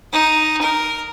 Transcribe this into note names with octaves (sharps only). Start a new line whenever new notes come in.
D#4
A#4